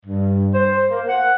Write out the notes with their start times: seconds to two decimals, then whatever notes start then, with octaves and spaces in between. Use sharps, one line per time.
0.06 G2
0.53 C5
0.90 A#3
1.08 F#5